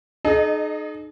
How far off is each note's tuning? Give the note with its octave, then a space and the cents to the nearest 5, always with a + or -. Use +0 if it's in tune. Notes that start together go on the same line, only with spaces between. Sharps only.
D#4 -30 G#4 +45 D#5 -5